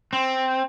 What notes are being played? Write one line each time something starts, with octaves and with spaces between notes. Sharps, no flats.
C4